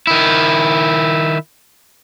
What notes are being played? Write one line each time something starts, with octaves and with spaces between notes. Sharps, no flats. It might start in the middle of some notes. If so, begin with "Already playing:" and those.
D#3 E4